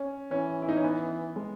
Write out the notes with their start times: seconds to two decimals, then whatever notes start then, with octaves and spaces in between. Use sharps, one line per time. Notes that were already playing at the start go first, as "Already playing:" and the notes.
Already playing: C#4
0.31 E3 C#4
0.62 E4
0.69 D#4
0.77 C#4
0.84 B3
1.36 G#3